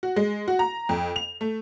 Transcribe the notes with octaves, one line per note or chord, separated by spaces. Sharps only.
F#4
G#3
F#4
A#5
F2
F7
A3